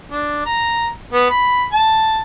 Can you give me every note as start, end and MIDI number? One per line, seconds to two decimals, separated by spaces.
0.10 0.44 62
0.46 0.89 82
1.13 1.25 59
1.30 1.65 83
1.73 2.22 81